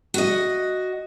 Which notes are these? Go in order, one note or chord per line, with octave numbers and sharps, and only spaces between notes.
F#4 D#5